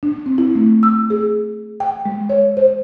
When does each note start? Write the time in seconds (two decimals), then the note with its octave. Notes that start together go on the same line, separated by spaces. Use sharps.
0.03 D4
0.26 C4
0.38 E4
0.55 A3
0.83 E6
1.10 G#4
1.80 G5
2.06 G#3
2.29 C#5
2.57 C5